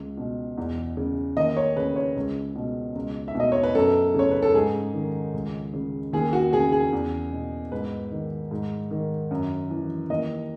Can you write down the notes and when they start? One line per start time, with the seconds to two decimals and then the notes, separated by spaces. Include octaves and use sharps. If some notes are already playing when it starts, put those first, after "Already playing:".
Already playing: C#2
0.18 B2
0.58 E2
0.97 C#3
1.37 D#2 D#5
1.57 C#5
1.76 C#3 B4
1.96 C#5
2.16 C#2
2.56 B2
2.95 C#2
3.28 E5
3.35 B2 D#5
3.52 C#5
3.63 B4
3.75 F#2 A4
4.14 C#3 C#5
4.31 B4
4.42 A4
4.54 G#2 G#4
4.94 D#3
5.34 C#2
5.74 C#3
6.13 D#2 G#4
6.33 F#4
6.52 C#3 G#4
6.72 G#4
6.93 E2
7.32 B2
7.72 G#2 B4
8.12 D#3
8.51 G#2
8.91 D#3
9.31 F#2
9.70 E3
10.09 D#2 D#5